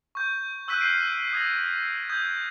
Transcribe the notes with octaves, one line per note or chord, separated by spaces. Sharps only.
C#6 G6
C#6 E6 F#6 G6 B6 D#7
F6 G6 B6 C7 D7 D#7
D#6 G#6 A#6
D#6 G6 G#6